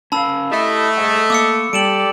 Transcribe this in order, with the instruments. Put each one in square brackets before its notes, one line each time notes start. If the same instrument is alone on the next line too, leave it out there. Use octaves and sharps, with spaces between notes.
[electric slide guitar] C#4 A#4 F5 [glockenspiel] A5 B5 E6
[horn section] A3 [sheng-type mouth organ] E4 D#5 E5 [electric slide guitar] G4
[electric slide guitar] G#4 C5 F#5 [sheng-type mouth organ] D#5
[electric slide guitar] A#3 [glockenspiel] D6 E6 C#7
[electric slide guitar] G3 [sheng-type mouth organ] G4 A4 D5 [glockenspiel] D7 E7 F#7